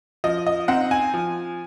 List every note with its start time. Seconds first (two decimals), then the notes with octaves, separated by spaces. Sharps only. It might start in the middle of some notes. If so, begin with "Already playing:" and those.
0.24 F3 D#5
0.47 D#5
0.68 C4 D#4 F#5
0.91 G#5
1.14 F3